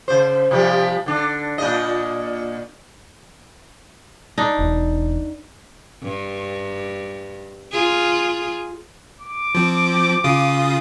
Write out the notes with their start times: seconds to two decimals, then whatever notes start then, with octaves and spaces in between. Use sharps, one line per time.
0.08 C#3 C5
0.51 C3 F3 G3
1.06 D3 D4
1.58 A#2 D4 D#5
4.38 D4 D#4
4.59 E1
6.03 G2
7.72 F4 G#4
9.21 D6
9.55 F3 C4
10.24 C#3 F4 D#6